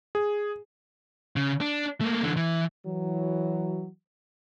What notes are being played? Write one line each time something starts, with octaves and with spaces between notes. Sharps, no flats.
G#4
C#3
D4
A3 A#3
D3 E3
E3
E3 F#3